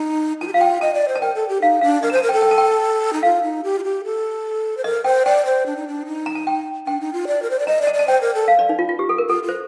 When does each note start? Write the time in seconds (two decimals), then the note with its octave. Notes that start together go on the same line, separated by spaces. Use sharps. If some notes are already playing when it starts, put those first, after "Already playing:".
Already playing: D#4
0.41 F4 A5
0.48 G4
0.54 F4 F5
0.61 G5
0.81 D#5 A5
0.94 D5
1.08 C5
1.15 A5
1.21 A#4 G5
1.35 A4
1.49 G4
1.62 D#4 F5
1.81 D4 F5
2.02 A#4 D#5
2.10 A#5
2.12 C5 A5
2.23 A#4
2.29 G5
2.33 A4
2.42 G5
2.51 A5
2.58 G5
3.13 D#4
3.23 F4 F5
3.43 D#4
3.64 G4
3.79 F4
3.84 G4
4.04 A4
4.77 C5
4.84 A#4 D#5
5.04 C5 G5
5.26 D5 G5
5.45 C5
5.66 D4
5.76 D#4
5.87 D4
6.06 D#4
6.26 A#5
6.35 A5
6.47 G5
6.86 D4 G5
7.01 D#4
7.13 F4
7.27 D5
7.42 A#4
7.50 C5
7.59 D5
7.67 D#5 A#5
7.82 D5
7.87 A5
7.94 D5
7.99 A5
8.08 C5 G5
8.21 A#4
8.35 A4
8.48 F5
8.59 D5
8.69 D#4
8.79 F4
8.89 F4
8.99 G4
9.09 A4
9.18 A#4
9.29 F4 A4
9.43 F4
9.49 C5